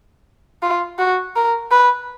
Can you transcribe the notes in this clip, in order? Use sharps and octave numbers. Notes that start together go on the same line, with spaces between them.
F4
F#4
A#4
B4